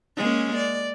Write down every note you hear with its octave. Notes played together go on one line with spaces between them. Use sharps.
G#3 A#3 C#4
D5